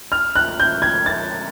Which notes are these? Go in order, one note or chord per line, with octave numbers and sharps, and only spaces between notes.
F6
F#6
G6
G#6
A6